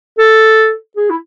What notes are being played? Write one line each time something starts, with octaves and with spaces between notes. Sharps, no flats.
A4
G#4
E4